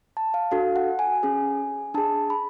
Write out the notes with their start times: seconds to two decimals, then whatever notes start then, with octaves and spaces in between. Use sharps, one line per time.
0.17 A5
0.34 F5
0.51 D4 F#4 A4 F5
0.76 F#5
0.99 G#5
1.23 C#4 G#4
1.94 D4 G#4 A5
2.30 B5